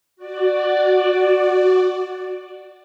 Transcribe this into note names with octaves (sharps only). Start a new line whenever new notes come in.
F#4 D5